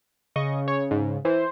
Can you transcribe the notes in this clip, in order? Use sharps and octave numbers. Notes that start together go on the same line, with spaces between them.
C#3 D#5 C#6
C#5
G#2
E3 C5